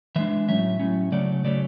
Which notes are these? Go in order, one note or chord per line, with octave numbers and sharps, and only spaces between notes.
E3 G#3 D4 E5
A2 F#3 C#4 E5
A2 F#3 C#4
C#3 F#3 A3 C#4 D5
C#3 F#3 A3 C#4 D5